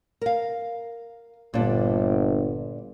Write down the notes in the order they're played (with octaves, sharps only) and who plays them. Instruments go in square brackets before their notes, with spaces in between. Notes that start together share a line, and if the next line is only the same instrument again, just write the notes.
[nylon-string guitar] A#4 F5
[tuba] G1 [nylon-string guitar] A#2 D4